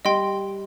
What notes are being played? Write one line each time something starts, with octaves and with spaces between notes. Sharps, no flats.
G3 D#5 G5 C6